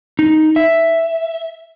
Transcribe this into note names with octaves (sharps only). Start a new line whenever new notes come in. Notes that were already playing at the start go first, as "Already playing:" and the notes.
D#4
E5